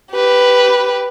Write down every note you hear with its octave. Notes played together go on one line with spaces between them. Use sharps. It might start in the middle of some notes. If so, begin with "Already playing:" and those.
G4 B4